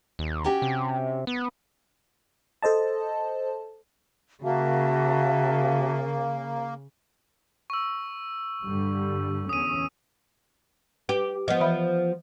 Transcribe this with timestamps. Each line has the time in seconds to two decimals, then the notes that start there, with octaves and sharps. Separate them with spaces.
0.19 D#2
0.44 C#4 F#4 G4
0.62 C3
1.27 B3
2.62 A4 C5 D#5 A5
4.44 C#3 A#3 F#4 E5 A5
7.70 C#6 E6
8.64 G2 D3 G3
9.49 E2 C#4 D#6 D#7
11.09 G4 B4
11.48 F3 B3 D#5
11.60 E3 E5 B5